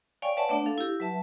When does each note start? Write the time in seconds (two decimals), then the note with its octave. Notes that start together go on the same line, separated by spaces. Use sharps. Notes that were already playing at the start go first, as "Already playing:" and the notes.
0.22 C#5 D5 F5 G5 G#5 C#6
0.37 B4 C#5 D5 E5 F#5 A5
0.49 A3 B3 D4
0.66 A4 F5
0.78 E4 G4
1.00 F#3 B4 E5 A5